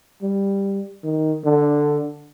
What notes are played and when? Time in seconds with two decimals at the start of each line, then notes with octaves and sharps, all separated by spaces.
0.22 G3
1.04 D#3
1.44 D3